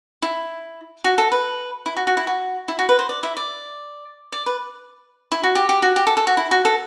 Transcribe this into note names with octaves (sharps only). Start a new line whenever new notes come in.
E4
F#4
A4
B4
E4
F#4
F#4
E4
F#4
E4
F#4
B4
C5
D5
E4 E5
D5
D5
B4
E4
F#4
G4
G4
F#4
G4
A4
A4
F#4
E4
F#4
A4